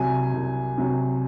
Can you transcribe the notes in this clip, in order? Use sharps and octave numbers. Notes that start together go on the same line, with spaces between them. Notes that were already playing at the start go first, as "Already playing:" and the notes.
Already playing: C2 C3 F#3 G#5
C2
C3 F#3